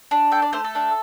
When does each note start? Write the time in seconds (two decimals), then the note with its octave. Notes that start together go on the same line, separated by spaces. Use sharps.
0.11 D4
0.32 A4 G5
0.42 D5
0.53 A3 C5
0.64 A4
0.75 D4